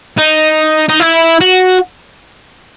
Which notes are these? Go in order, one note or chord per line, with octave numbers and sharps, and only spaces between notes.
D#4
D#4
E4
F#4